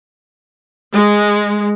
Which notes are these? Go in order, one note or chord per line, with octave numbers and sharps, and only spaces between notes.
G#3